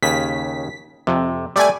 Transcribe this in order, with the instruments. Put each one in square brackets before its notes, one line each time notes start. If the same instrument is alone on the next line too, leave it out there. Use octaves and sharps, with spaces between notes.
[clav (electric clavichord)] D#2 C#3 [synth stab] B6
[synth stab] F2 [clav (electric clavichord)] C3
[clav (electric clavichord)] G3 A3 [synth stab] D5 G#5